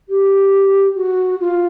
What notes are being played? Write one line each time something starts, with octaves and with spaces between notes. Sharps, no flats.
G4
F#4
F4